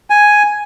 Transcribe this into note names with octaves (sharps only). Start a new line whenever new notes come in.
G#5